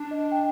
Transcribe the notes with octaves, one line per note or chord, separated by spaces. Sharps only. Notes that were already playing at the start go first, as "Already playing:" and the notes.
Already playing: D4
D#5
G5